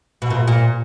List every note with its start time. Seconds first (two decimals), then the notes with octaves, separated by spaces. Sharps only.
0.22 B2
0.30 A#2
0.47 A#2